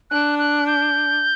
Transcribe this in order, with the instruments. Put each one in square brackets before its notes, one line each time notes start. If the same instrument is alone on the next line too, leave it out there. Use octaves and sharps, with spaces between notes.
[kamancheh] D4 [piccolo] F#6
[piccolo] F#6
G6